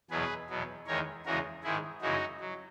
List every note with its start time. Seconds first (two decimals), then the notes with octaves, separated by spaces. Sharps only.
0.10 E2 B2 F#3 G#4 B4
0.49 E2 B2 F#3
0.87 E2 D#3 G#3 A#4 C#5
1.25 E2 C#3 E3 G#3 F#4 A#4
1.63 G#2 D#3 G#3 E4 G#4
2.02 F#2 C#3 E3 G#3 D#4 F#4
2.40 F#3